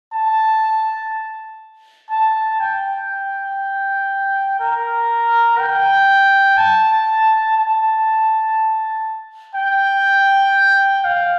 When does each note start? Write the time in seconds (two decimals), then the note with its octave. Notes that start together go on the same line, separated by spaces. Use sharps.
0.13 A5
2.11 A5
2.60 G5
4.60 A#4
5.59 G5
6.57 A5
7.57 A5
9.55 G5
11.04 F5